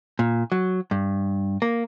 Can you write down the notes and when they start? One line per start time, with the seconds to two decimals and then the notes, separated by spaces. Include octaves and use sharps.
0.19 A#2
0.52 F#3
0.91 G2
1.62 A#3